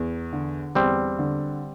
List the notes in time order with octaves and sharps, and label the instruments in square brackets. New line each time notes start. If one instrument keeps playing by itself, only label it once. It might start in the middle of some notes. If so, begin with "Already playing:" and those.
Already playing: [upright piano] E2
D3
[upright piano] E2 [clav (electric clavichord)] G3 C4
[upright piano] D3